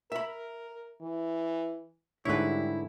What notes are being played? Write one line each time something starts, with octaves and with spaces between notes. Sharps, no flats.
A#4 E5 B5
E3
G#2 D3 G3 E4 B4 C#5